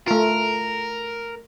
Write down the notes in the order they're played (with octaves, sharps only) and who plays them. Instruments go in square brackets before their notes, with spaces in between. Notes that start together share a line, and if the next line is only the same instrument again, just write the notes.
[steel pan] A3 F4 [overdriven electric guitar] A#4